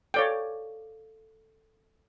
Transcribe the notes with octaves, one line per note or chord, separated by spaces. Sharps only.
A4 C#5 D5 F5 G5